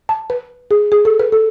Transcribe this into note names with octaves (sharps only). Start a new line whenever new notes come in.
A5
B4
G#4
G#4
A4
B4
A4